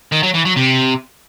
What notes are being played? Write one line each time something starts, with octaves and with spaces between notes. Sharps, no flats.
D#3
F#3
E3
F#3
C3